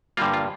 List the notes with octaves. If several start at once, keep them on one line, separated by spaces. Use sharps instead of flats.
G2 D3 G3 A#3 F4
F4